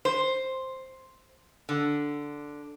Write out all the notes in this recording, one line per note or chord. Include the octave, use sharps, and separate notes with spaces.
C5
D3